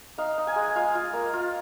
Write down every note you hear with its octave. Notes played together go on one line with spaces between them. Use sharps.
D#4 F5
D#4
G#5
G#3
F4 F5
F4
A#3
F4